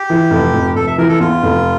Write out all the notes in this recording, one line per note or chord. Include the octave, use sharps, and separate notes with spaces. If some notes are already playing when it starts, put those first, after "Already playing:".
Already playing: G4
E3
F1
F1
F1 A4
E5
E3 A#4
A4
E2 F4
F1